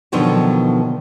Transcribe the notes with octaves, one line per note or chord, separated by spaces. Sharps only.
B2 D3 D#3 F3 F#3 B3